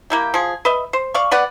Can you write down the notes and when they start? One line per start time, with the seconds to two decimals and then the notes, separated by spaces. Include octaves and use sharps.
0.10 A#3 E4 G4
0.34 F3 G#4
0.65 B4 D#5 E5
0.93 C5
1.14 D5 F5 C#6
1.31 B3 B4 D5 F#5